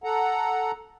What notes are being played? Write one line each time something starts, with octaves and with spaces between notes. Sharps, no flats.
A4 F#5 A#5